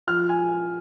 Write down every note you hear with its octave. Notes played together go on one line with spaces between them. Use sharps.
F3 F6
G#5